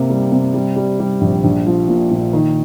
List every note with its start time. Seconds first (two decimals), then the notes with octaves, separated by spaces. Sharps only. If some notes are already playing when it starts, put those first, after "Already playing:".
Already playing: C3 A#3
0.10 G3
0.32 C3
0.54 G3
0.76 G3
1.00 G3
1.21 A#1
1.44 A#1
1.67 F3
1.88 A#2
2.11 A#2
2.33 D#3